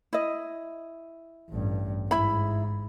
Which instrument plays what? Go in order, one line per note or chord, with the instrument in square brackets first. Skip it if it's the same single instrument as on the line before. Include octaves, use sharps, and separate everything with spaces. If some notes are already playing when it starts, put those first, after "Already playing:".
[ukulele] E4 D#5
[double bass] A1 G2
[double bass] G#2 [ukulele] E4 B5